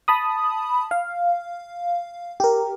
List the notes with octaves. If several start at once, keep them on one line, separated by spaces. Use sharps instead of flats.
A5 B5 D#6
F5
G4 A#4